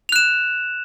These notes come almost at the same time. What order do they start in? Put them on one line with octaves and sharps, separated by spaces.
F7 F#6 E7